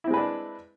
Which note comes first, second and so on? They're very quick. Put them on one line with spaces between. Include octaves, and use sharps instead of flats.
E4 C4 G#3 B4 D4